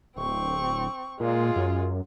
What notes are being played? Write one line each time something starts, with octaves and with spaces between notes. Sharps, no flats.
D1 C4 C#6
A#2 G#3 F4
F#2